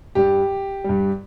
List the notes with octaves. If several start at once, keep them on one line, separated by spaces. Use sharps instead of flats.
G2 G3 G4
G2 G3